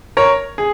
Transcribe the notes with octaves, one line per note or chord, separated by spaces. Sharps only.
A#4 C#5
G#4